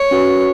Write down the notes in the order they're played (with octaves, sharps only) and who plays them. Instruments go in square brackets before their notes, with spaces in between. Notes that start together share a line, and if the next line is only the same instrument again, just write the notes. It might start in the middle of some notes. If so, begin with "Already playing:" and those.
Already playing: [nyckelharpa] C#5
[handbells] C#4 F#4 B4